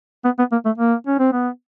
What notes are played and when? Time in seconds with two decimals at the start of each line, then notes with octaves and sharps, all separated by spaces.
0.25 B3
0.39 B3
0.52 A#3
0.65 A3
0.78 A#3
1.07 C#4
1.19 C4
1.32 B3